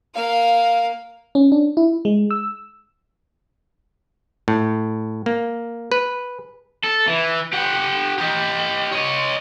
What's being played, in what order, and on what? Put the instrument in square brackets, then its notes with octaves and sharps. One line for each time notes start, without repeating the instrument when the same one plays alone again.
[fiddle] A#3 F5
[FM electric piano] C#4
D4
E4
G#3
E6
[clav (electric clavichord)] A2
A#3
B4
[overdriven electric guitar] A4
E3
G4 F#5
G4 D#5
C#5 D#5